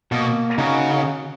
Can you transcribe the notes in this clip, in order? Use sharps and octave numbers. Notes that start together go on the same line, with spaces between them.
B2 A#3
C#3 D#4 F#4 A#4